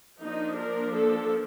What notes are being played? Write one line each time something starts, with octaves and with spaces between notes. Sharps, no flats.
F3 A#3 D4 D#4
A#4
A4